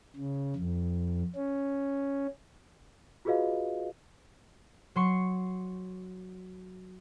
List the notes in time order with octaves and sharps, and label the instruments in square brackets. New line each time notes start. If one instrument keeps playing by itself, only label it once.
[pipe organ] C#3
F2
C#4
[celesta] F4 F#4 G#4 B4 D#5 F5
[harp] F#3 C6 C#6